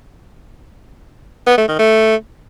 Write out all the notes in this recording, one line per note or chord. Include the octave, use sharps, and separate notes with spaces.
B3
A3
D#3
A3